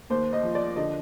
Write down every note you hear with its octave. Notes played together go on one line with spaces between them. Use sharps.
D#2 C5
D#5
F3
D5
D3 D#5